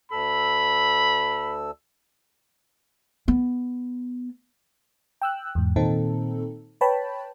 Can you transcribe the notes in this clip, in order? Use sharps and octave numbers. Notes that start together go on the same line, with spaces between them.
D2 A4 B5 E6
B3
G5 E6 F#6
E2 G#2
A#2 D#3 C4 D#4 A4
B4 C#5 G5 A5 B5